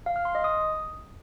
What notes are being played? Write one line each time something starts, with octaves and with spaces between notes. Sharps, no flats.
F5
F6
C6
D#5
D#6